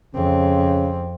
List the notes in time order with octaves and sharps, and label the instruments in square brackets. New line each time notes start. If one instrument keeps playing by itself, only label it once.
[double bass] F2 C4 [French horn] C#3